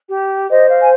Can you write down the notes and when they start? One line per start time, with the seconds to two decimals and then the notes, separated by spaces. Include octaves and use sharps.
0.11 G4
0.50 C5 D#5
0.68 F5
0.80 G#5